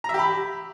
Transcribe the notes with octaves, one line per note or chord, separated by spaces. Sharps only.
G4 E5 A#5 B5